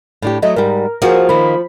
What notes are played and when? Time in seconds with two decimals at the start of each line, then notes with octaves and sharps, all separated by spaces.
0.22 A2 D4 G4
0.42 F#3 A3 D#5
0.56 G#2 G3 A#4
1.02 F3 A#3 F#4 G#4
1.29 D#3 A#3 B5